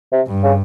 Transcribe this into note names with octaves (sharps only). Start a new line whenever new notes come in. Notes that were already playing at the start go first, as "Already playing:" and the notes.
C3
G2
C#3